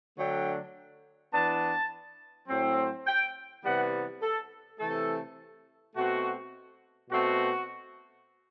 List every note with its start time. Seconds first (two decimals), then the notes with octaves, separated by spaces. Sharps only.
0.17 D3 F#3 A3 D4 G5
1.32 E3 B3 D4 A5
2.48 A2 F#3 C4
3.07 G5
3.64 C3 E3 G3 B3 F#5
4.21 A4
4.79 C3 E3 A3 A4
5.95 B2 A3 C4 F#4
7.10 B2 A3 C4 F#4